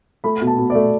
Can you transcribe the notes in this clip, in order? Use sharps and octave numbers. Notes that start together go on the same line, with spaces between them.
A3 B5
B2
A5
B2
A3 D5